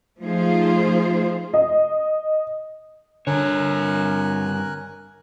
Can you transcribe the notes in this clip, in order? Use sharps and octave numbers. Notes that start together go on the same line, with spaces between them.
F3 A3 D#4 F4 G#4 C5
D#5
G2 D3 A#4 C#5 G#5 F#6